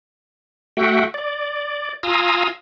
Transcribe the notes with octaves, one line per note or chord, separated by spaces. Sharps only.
A3 F#4 E5 F#5 G5
D5
F4 F5 G#5 A#5 D#6 E6